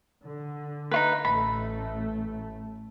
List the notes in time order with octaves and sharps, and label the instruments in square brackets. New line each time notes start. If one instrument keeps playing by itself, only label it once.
[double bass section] D3
[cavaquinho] D#4 F4 B4
[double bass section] A1 A3 [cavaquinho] B5